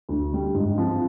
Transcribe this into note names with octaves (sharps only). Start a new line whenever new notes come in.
D2
D3 G3
G#2
F3 C4